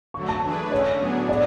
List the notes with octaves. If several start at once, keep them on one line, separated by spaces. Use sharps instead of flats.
D3 F#3 A3 C#6
A5
E3 A3 D4 G#4 B4
D3 A3 C#4 C#5
A2 F#3 B3 D4 G#4
D5